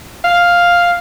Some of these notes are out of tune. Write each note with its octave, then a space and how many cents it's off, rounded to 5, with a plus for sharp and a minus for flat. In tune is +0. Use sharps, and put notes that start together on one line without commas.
F5 +5